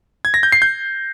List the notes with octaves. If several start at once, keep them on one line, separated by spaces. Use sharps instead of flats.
G#6
A#6
G6
C7
G6